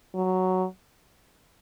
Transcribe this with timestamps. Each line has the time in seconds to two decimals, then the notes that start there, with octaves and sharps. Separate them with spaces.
0.15 F#3